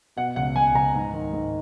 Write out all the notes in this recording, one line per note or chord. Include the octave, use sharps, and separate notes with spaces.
B2 F#5
C#2 F#5
C#2 G#5
C#2 A#5
G#2
D#3
G#2